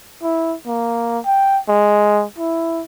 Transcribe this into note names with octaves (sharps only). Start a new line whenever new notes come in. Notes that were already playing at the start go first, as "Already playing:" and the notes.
E4
A#3
G5
G#3
E4